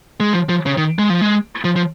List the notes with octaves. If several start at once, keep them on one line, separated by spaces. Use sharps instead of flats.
G#3
F3
F3
C#3
D#3
G#3
F3
G#3
F3
F3